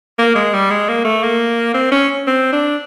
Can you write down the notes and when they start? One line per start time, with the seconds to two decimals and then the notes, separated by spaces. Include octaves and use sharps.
0.19 A#3
0.35 G#3
0.53 G3
0.71 G#3
0.88 A#3
1.05 A3
1.23 A#3
1.74 C4
1.92 C#4
2.27 C4
2.53 D4